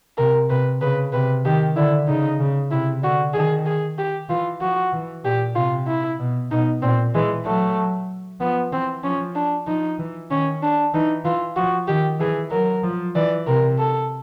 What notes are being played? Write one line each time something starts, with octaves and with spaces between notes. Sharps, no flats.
C3 A#4
C3 B4
C#3 B4
C3 B4
D#3 G4
D3 E4
C#3 D#4
C#3
C3 E4
D3 F#4
D#3 G#4
G#4
G4
E3 F4
F3 F#4
E3
A#2 G4
C3 F4
E4
B2
B2 D#4
A#2 C4
E3 G#3
F#3 A3
F3 B3
E3 C4
F3 C#4
D4
F3 D#4
E3
D#3 C#4
D4
E3 D#4
E3 F4
F3 F#4
D#3 G4
E3 G#4
F#3 A#4
F3
E3 D5
C3 A#4
A4